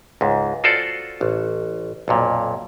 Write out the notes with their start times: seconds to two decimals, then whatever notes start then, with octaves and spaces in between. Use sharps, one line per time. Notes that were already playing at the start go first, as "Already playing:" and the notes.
0.21 C#2 G#2
0.64 F4 F#4 A4 C5 D5
1.21 A1
2.08 B1 F2 A#2